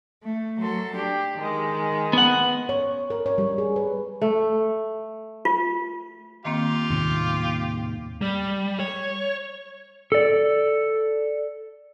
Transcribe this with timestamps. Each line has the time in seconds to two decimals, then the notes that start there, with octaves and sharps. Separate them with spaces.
0.24 A3
0.59 F#3 A4 C6
0.96 D4 G4
1.37 D#3 G#3
2.13 B3 F#5
2.69 C#5
3.10 A#4
3.26 C#5
3.38 G3
3.58 G#4
3.76 B4
4.21 A3
5.45 F4
6.45 D#3 A#3 C4 F4 G4
6.90 D#2 A2 C3
8.21 G3
8.80 C#5
10.12 A4 D5